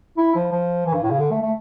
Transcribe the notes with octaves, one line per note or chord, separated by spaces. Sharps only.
E4
F3
F3
E3
G2
A2
C#3
D3
A3
A3